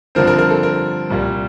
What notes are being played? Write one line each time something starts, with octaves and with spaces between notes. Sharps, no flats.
G2 D3 F3 C4 A#4
A#4
A#4
A4
A#4
C2 A#2 G3 A#3